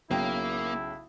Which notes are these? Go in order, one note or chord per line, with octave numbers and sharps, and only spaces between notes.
B1 C#3 A#3 E4 G5